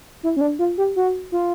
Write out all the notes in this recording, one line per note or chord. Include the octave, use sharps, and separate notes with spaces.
E4
C#4
D4
F4
G4
F#4
F4